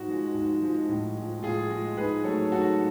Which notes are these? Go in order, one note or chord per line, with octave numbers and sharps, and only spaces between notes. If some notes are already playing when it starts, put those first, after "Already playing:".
Already playing: G#2 F#4
F3 G#3
G#2
F3 G#3
A2
F3 G#3
A2 F4 G#4
F3 G#3
G#2 G#4 B4
F#3 A3 A4 C#5
G#2 F#4 A4